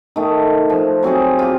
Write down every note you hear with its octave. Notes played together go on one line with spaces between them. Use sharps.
D#3 A3
F3
F#3 C4 G#4 F#5
F4 G4